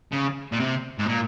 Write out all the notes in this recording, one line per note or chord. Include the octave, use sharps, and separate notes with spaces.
C#3
A#2
C3
G#2
A#2